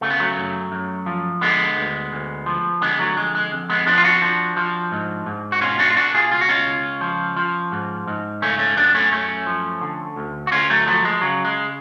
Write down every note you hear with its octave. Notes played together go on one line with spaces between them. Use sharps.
C#3 A3
B3
F#3 A3
F#2
F#2
F3
D3 G#3 B3
D2
D2
F3
D3 G#3 B3
F#3 A3
F2 G#3
G#3
F2
G#3 B3
F3 B3 D4
F4
D4 F#4
F3
F3
G#2
G#2
F#4
B2 C#4 F4
D4 F#4
F4
B2 D4 F#4
F4 G#4
C#2 F4
F#4
C#4 F4
C#2
F3
F3
G#2
G#2
C#3 A3 C#4
A3 C#4
F#2 B3 D4
A3 C#4
F#2 A3 C#4
F3
D3
D2
F#4
D2 C#4 F4
F#3 A3
F3 F#3 A3
G#3
C#3 F#3
G#3